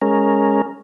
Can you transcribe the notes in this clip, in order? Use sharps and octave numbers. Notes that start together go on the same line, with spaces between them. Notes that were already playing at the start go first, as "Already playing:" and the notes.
G#3 C#4 A#4